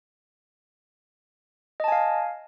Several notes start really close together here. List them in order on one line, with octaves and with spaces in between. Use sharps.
D#5 A5 G#5 F5